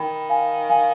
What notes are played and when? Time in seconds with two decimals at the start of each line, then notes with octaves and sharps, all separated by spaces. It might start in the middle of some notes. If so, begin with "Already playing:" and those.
Already playing: D#3 G5 B5
0.29 F5 G#5
0.69 F5 G#5